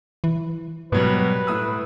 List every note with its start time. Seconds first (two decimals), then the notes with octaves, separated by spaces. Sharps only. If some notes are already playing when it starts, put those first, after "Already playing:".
0.24 E3
0.92 G#2 B2 F#3 G3 B4
1.47 A2 D#6 E6